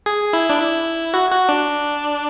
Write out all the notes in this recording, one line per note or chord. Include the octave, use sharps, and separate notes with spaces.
G#4
E4
D4
E4
F#4
F#4
D4